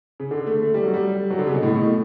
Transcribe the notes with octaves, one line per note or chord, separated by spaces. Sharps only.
C#3
D3
A3
A3
G3
F#3
G3
F#3
D3
C#3
B2
A2
B2
A2